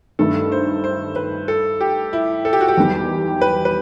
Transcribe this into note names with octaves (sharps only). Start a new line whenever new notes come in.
G2 D#3 A3 A4
C5
C5
B4
A4
G4
E4
A4
G4
F#4
G4
E2 D#3 G3
B4
B4